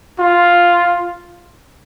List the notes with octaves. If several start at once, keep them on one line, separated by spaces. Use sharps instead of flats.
F4